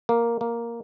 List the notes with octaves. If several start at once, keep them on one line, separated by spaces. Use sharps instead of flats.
A#3
A#3